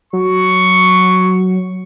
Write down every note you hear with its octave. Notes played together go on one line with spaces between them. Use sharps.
F#3 C#6